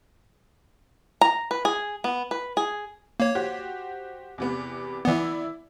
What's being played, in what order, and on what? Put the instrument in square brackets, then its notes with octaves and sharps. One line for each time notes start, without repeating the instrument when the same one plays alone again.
[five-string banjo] A#5
B4
G#4
B3
B4
G#4
[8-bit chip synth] A#3 C#5
[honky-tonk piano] F#4 G4 C5
E2 C3 B3
[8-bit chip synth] E3 B3 [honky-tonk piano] E4 D5